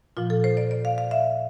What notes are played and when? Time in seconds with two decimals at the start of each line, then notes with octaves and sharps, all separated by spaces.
0.17 A#2 F3 F4
0.30 A4
0.44 C5
0.57 D5
0.71 D5
0.85 F5
0.98 F5
1.11 E5